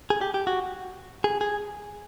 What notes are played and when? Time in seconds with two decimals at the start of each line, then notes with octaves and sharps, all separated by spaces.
0.10 G#4
0.21 G4
0.34 G4
0.47 F#4
1.24 G#4
1.41 G#4